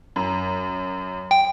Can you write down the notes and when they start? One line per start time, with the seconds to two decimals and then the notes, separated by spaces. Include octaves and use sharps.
0.16 F#2
1.31 G5